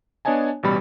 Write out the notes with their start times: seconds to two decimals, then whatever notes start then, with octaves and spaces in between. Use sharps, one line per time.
0.25 B3 D4 C#5 D#5 G#5 A5
0.63 A1 B2 G3 B5